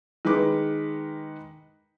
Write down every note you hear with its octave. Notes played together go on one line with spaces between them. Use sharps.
D#3 G#3 B4 D6